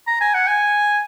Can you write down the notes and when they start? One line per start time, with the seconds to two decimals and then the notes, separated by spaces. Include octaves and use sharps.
0.07 A#5
0.21 G#5
0.34 F#5
0.47 G#5